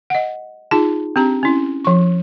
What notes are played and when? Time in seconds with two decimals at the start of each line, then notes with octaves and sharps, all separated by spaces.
0.10 D#5 F#5
0.71 D#4 F4 G#4 A5
1.16 C4 D4 G4 A#5
1.43 C#4 E4
1.85 F3 C#6